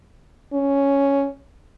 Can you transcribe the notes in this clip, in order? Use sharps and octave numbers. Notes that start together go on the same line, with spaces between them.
C#4